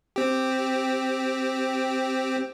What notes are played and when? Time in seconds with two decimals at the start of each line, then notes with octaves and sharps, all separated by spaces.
0.16 C4 G4